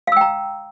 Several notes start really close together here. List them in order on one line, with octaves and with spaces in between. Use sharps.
F5 E6 G5 A#5